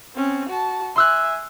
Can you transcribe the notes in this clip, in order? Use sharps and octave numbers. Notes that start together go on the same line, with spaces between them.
C4 C#4
F#4 A5
E5 G#5 C6 E6 F#6